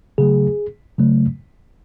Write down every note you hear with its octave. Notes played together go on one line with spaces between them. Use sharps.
C#3 F#3 A3 G#4
C#3 F#3 A3